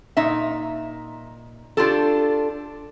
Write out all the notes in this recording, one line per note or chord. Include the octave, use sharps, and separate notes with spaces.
A#2 D#4 E5
D4 F4 G4 A4